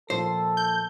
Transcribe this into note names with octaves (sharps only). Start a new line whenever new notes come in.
A#2 F3 A4 C5
G6